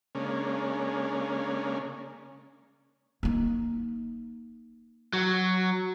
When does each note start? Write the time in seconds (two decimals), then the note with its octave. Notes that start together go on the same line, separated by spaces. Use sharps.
0.15 C#3 G#3 A#3 C#4 D4
3.23 A#3 D#4
5.13 F#3